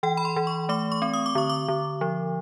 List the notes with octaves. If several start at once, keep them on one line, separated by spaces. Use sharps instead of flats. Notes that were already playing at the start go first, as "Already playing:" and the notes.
E3 G5
B5
C6
E3
C#6
A3 D6
C#6
C4
D#6
D6
D3 C#6
D6
D3
F3